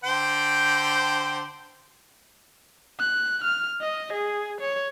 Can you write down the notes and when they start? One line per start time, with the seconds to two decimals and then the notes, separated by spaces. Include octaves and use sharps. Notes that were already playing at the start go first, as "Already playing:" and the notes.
0.04 D3 C5 G5
2.99 F#6
3.44 F6
3.81 D#5
4.13 G#4
4.60 C#5